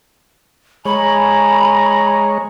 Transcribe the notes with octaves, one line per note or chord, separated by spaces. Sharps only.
G#3 C#5 G#5 A#5 B5